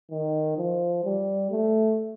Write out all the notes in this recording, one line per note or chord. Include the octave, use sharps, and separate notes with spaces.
D#3
F3
G3
A3